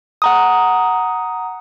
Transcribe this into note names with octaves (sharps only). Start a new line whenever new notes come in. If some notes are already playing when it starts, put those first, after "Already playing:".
F#5 A#5 D#6